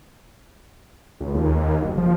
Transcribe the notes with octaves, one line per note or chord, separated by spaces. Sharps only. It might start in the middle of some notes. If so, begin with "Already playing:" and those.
C#2
D#2
F#1
F3